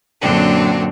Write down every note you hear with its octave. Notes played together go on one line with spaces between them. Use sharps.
F#2 A#2 D3 F#3 C4 D4